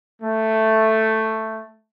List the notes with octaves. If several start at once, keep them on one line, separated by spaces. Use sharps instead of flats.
A3